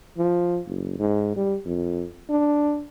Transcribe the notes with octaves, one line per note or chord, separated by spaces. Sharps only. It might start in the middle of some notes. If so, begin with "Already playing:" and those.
F3
F#1
G#2
G3
F2
D4